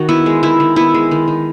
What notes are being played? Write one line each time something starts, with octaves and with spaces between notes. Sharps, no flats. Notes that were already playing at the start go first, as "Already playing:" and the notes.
Already playing: D#3 F#4
B3 E4
G#3
D#3 E4
D#3
B3 E4
G#3
D#3
D#3